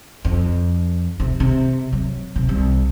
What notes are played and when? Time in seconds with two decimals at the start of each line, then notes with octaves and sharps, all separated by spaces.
0.25 F2
1.20 C3
1.40 C3
1.92 F#3
2.36 C3
2.49 C2